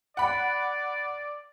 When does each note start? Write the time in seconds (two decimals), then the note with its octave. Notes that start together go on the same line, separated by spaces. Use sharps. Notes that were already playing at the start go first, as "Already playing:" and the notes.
0.17 D5 F#5 B5